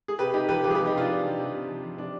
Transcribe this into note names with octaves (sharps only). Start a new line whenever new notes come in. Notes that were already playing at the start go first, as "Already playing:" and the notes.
G#4
C3 G4 B4
C3 D#4 G4
F3 G4 B4
F3 G4 B4
G#4
G4 B4
C3
D#4 G4
C3 D4 F4
F3
F3
C3
C3
F3
F3
C3 D4